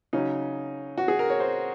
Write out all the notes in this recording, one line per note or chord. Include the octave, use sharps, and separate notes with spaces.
C#3 F#3 C#4 D#4
F#4
G#4
A#4
C#5
C5